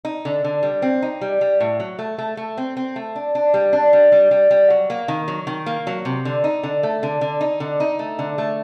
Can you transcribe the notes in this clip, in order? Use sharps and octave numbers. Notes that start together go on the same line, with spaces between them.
D#4
D3
D3
G3
C4
D#4
G3
G3
A2
F#3
A3
A3
A3
C4
C4
A3
D4
D4
G3
D4
G3
G3
G3
G3
F#3
A#3
D#3
F#3
D#3
A#3
F#3
C3
D3
D#4
D3
A3
D3
D3
D#4
D3
D#4
A3
D3
A3